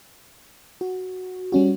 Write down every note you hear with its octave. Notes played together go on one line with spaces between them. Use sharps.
F#4
G3 C#4 F#4